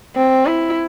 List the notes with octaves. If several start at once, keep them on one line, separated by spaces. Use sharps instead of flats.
C4
E4